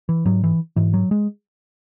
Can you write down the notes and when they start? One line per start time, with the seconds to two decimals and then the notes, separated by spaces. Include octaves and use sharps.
0.09 E3
0.25 G#2 F#3
0.44 E3
0.76 G#2 E3
0.94 F#3
1.11 G#3